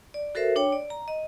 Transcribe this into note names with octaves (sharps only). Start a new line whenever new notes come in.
D5
F#4 A4 A#4 C5 E5
D4 C#5 G5
D5
A#5
D#5